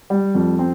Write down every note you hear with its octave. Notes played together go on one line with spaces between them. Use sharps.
G3
F2
C4